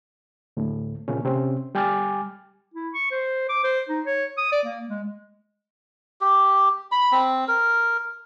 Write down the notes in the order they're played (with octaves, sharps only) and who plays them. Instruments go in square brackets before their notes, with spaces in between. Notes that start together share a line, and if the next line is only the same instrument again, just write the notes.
[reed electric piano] D2 A2
A#2 C#3 C#4
C3 C4 C#4
G3 G5 G#5 D6 F6 A6
[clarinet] E4
C#6
C5
D6
C5
D#4
C#5
D#6
D5
A#3
G#3
[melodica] G4
B5
C4
A#4